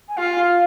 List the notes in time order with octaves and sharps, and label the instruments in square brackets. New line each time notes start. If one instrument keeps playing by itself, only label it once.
[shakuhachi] G#5
[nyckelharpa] F4 [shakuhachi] F5